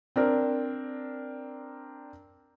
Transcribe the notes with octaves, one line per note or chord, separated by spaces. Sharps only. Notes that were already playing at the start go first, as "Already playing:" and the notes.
C4 D4 A#4